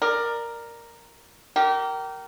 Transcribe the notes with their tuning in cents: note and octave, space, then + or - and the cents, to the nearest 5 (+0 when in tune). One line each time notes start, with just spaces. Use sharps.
A#4 +0 D5 +20
G4 -30 A#4 -5